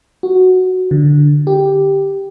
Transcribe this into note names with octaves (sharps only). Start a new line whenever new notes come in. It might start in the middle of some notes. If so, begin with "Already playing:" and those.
F#4
D3
G4